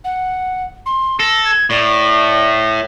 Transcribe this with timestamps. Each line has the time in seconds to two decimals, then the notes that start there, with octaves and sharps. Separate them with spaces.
0.04 F#5
0.86 C6
1.20 A4 A#6
1.45 G#6
1.70 A2 D5